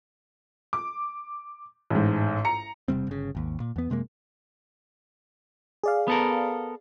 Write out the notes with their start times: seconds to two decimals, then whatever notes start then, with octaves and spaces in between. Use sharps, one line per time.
0.73 D6
1.90 A1 G#2
2.45 A#5 C#7
2.88 E1 C3 G3 C4
3.07 G1 C#3
3.35 G#1 D#2
3.60 A#2
3.76 E2 B3
3.90 F#2 C3 G#3 A#3
5.84 G#4 D5 F5
6.08 B3 A4 A#4